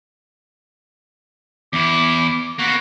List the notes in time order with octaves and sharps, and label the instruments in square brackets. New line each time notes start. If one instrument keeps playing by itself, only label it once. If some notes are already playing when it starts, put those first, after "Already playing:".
[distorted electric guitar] E2 E4 [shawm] D6
[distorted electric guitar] A#3 B3 [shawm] F#4